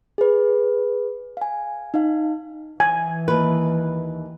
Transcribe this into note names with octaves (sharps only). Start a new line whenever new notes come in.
G#4 B4
F5 G#5
D#4 F5
E3 G#5
D#2 B4